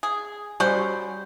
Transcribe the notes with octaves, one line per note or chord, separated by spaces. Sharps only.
G#4
G3 C#4 F#4 C5